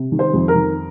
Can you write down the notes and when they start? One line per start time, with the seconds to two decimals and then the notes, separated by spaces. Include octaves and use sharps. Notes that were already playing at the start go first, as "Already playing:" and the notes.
Already playing: C3
0.12 D#3
0.19 C5
0.33 F2
0.48 A#4
0.55 D#3